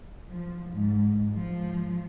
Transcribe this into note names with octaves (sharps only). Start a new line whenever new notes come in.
F3
G#2
F3